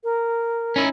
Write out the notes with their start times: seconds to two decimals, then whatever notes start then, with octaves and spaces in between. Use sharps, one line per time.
0.04 A#4
0.76 C#4 D#4 E4